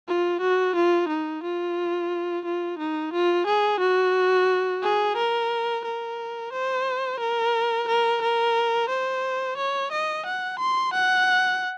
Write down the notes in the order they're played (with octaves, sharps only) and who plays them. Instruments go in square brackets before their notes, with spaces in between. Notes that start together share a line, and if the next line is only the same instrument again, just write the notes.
[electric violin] F4
F#4
F4
D#4
F4
F4
D#4
F4
G#4
F#4
G#4
A#4
A#4
C5
A#4
A#4
A#4
C5
C#5
D#5
F#5
C6
F#5